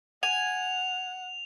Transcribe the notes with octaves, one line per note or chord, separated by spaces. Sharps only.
F#5 G#5 F7